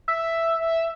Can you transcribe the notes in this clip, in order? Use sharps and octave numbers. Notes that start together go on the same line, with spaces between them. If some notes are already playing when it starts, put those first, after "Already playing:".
E5